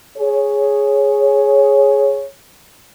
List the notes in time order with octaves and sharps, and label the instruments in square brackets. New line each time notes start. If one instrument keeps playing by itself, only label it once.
[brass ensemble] G#4 C#5